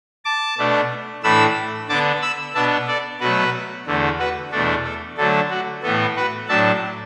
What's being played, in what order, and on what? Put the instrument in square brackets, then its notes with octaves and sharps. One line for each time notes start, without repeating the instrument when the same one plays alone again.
[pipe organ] A5 D6
B2 A3 D4
A2 E3 A3 D4 B5 E6
D3 B3 D4 A5 D6
B5 E6
B2 B3 D4 E5 A5
A4 D5
B2 F#3 A3 F#4 B4
E2 D3 A3
F#4 B4
E2 B2 A3 D4 A4
A4
D3 F#3 A3 D4 A4
F#4
A2 E3 B3 A4
F#4 B4
A2 F#3 D4 E5 A5